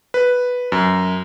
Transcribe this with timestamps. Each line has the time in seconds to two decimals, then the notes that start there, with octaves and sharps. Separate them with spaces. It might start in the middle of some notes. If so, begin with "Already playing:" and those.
0.14 B4
0.72 F#2